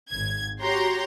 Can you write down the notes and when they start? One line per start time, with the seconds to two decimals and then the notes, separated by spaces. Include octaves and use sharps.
0.10 G#1 G#6
0.62 F#4 G4 C#5 A#5 C6